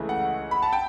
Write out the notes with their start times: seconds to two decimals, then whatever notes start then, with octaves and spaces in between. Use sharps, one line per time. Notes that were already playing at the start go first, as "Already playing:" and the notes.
Already playing: C#2 C#3 E3 A3
0.09 F#5
0.51 B5
0.62 A5
0.73 G5